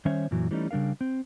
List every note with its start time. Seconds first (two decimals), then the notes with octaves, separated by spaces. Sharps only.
0.05 D#3 G3 C#4 C5 C#5 E5
0.31 F#2 A#2 E3 F#3
0.51 E3 G3 A3 C#4 D#4
0.71 C#3 G3 D4 A#4 F5
1.01 C4